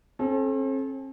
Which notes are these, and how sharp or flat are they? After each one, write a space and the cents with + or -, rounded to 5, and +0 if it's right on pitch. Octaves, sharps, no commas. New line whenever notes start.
C4 +45 A4 -30